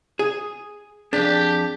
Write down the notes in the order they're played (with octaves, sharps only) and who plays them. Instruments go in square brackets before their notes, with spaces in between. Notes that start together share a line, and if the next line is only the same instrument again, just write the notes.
[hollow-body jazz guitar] G#4
[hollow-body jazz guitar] F2 D4 [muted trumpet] G4 [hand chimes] G#4 B6